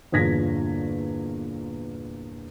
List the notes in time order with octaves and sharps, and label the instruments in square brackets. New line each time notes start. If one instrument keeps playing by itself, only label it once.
[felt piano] G1 E2 A#2 G#6 A#6 B6